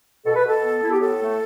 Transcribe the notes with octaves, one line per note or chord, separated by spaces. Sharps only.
B2 A4
B4
B2 A4
B3
B3 E4
G4
A2 A4
A3